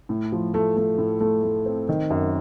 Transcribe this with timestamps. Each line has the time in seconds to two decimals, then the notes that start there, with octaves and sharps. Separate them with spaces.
0.09 A2
0.32 F3
0.54 A3
0.77 A3
0.98 A2
1.21 A3
1.43 A3
1.66 C4
1.89 D#3
2.10 F#2